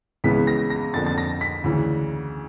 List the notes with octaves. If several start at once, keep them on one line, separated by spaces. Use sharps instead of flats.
C#2 C#3 E3 G#3 B3 B6
A#6
A#6
F2 D3 F3 A#3 A6
A6
A#6
B6
D2 C#3 E3